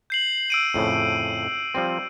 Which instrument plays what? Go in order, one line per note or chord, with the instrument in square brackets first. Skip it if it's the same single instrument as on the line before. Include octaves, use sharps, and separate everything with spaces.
[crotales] G6 C7 F#7
E6 D7 D#7
[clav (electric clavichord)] F2 A2 C#3
F3 G3 C4